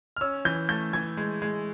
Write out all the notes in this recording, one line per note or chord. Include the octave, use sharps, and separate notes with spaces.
F6
C#4 E6
E3 G6
A3 G6
E3 G#6
G#3
G#3